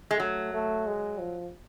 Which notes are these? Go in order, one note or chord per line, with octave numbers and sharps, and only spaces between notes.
G#3
F#3 A3
A3
G#3
F3